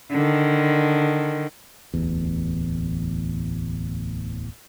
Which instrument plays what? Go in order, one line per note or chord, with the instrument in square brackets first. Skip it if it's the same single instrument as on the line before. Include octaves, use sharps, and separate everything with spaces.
[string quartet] D3 D#3
[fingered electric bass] D1 A1 E2